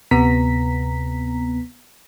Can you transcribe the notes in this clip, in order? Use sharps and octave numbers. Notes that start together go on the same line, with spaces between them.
D2 C3 B3 A#5 B6